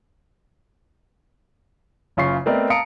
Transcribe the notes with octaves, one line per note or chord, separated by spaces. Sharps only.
F#1 C#3 F4 C#6 C7
A3 B3 C4 A#4 D5 D#5
F5 A5 A#5 D#6 C#7 D7